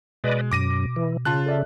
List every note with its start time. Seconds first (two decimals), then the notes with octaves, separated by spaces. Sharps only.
0.24 B2 G#3 B4 D5 D#5
0.51 F#2 D6 A#6 D#7
0.96 E3
1.25 C#3 F4 A5 F#6
1.46 A4 D5 E5